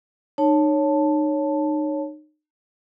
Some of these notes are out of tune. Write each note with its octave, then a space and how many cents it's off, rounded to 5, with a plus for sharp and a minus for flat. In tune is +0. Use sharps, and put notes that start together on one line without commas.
D#4 -35 C#5 +0 A5 +0